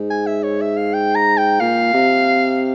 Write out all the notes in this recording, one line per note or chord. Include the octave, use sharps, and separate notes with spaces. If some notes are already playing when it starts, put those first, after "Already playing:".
Already playing: G#2
G#5
E5
C#5
E5
F5
G5
A#5
G5
A#2 F5
C3